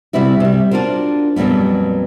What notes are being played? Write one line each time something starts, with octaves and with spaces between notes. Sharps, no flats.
C3 G3 C4 E4 F#4
C3 G3
D4 F4 F#4 A#4 C5
F2 A#2 F#3 G3 B3